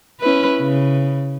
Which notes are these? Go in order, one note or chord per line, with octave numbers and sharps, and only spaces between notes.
C#4 E4 B4
C#3